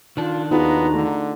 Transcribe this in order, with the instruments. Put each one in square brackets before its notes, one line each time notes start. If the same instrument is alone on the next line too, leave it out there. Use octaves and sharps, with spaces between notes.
[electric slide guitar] D#3 D4 [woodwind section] F4
[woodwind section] D#2 F#4 A#5 [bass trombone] B3 [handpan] D#4 F4 G#4
[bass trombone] D3 [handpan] A3